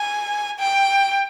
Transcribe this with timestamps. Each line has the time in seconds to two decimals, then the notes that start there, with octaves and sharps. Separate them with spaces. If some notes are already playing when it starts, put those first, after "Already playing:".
Already playing: G#5
0.60 G5